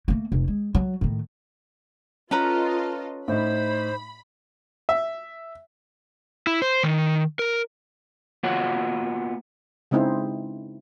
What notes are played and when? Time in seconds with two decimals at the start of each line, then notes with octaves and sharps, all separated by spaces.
0.08 A3 A#3
0.32 F1
0.48 G#3
0.75 F#3
1.01 A2 D#3
2.31 C#4 F4 A4 B4 D#5 A#5
3.28 A2 D#4 C5 B5
4.89 E5
6.47 E4
6.62 C5
6.83 D#3
7.39 A#4
8.43 A#3 B3 F4 F#4 C#5 F#5
9.91 C#3 G#3 C4 D#4 E4 C5